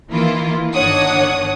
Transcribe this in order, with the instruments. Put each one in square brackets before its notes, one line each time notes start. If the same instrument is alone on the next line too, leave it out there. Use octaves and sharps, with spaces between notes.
[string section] D#3 E3 A#3 E4 F4
G1 D#3 D4 C#5 F#5 D#6